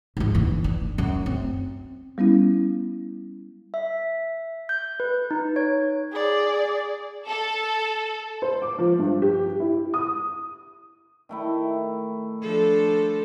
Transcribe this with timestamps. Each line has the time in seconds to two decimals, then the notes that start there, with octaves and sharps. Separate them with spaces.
0.17 G#2 F3
0.35 G1 E3
0.64 D4
0.98 F#2
1.26 C4
2.18 G3 B3 C#4 E4
3.74 E5
4.69 G6
5.00 B4
5.31 D#4
5.56 C#5
6.12 G#4 D5
7.28 A4
8.42 C5
8.62 D6
8.78 F3
8.99 G2
9.22 G4
9.60 E4
9.94 D#6
11.29 D#3 A3 E4
12.42 F3 D4 A4